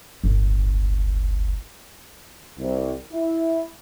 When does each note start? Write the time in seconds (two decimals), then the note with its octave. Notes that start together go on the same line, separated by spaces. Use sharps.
0.24 D1 G1
2.59 C2
3.12 E4